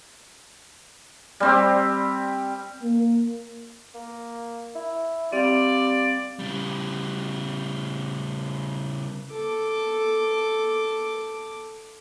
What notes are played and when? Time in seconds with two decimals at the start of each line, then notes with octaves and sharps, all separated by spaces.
1.40 G3 C4 G4
2.83 A#3
3.94 A#3
4.75 E4
5.33 G3 C4 D5 F5
6.39 C#3 G3
9.31 A4 D6